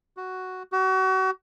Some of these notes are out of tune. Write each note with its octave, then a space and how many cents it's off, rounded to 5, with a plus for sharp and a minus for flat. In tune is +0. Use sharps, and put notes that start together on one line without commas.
F#4 +5
F#4 +35